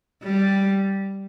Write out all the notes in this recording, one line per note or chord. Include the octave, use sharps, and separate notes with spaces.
G3